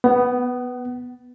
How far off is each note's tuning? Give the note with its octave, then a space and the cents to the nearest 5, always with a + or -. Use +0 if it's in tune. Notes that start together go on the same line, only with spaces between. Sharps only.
B3 +0 F#5 +35